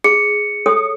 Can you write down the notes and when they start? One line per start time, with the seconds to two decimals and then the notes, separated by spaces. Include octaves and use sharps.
0.04 G#4 C#7
0.66 A4 C#5 D#6